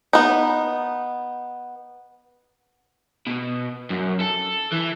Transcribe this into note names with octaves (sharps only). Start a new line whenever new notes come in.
B3 D#4
B2
F#2
A4
E3